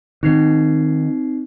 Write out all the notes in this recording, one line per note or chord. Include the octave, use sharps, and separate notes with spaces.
D#3 C4 D#4 C7